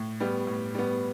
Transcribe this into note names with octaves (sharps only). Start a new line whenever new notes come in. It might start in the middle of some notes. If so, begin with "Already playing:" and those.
Already playing: A2
G3 B3
A2
G3 B3